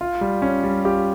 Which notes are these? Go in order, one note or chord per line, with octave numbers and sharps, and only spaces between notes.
F4
G3
C#4
G3
F4 G4